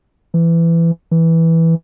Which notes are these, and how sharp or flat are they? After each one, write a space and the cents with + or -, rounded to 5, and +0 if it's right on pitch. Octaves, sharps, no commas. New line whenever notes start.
E3 +20
E3 -5